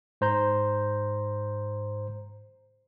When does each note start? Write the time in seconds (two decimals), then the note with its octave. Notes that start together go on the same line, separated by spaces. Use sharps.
0.21 G#2 C5 A#5 G6